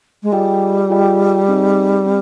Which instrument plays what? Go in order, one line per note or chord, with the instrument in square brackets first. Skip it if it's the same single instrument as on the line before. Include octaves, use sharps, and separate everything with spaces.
[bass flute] G#3
[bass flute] G3 [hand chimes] F4 G#4 D#5 G5
[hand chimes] F4 G#4 D#5 G5
C4 D#4 G#4 D#5
C4